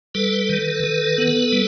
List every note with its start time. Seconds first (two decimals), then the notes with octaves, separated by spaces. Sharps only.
0.14 G3 A4 B4
0.49 D#3
0.84 D#3
1.18 B3
1.52 G3